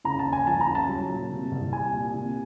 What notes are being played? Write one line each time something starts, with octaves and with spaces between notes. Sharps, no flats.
C#3 A#5
A5
D#2
G#5
F3 A5
A#5
C#3
A5
F#3
A#2
C3
C2
G3 G#5
A#2
C3